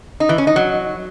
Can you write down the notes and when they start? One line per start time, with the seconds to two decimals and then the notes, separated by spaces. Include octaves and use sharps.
0.20 D#4
0.29 E3
0.38 C#4
0.47 D#4
0.56 F#3